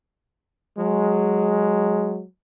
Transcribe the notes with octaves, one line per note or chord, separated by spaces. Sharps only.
F#3 G#3